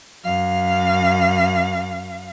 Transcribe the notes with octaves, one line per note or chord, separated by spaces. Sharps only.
F#2 F5